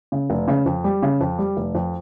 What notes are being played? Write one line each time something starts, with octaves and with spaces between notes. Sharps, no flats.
C#3
F1
C#3
F2
G3
C#3
F2
G3
F1
F2